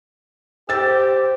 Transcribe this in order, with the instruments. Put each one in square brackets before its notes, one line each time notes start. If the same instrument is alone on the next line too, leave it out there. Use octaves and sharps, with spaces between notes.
[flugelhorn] G4 [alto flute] C5 [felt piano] E6 A6